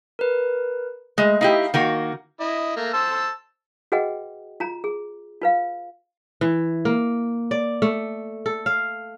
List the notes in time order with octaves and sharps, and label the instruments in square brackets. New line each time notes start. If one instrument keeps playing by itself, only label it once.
[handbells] A#4 B4
[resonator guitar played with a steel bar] G#3 [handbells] A3 D#5
[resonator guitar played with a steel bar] D#4 E4 G4 [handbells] F5
[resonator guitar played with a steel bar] D#3 A#3 F#4
[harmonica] E4 D#5
A3 A#3
C5 A5 E6
[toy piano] F#4 G#4 B4 D#5 F#5 G5
F4 A#5
G#4
F4 B4 F5
[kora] E3
A#3
D5
A3
A4
F5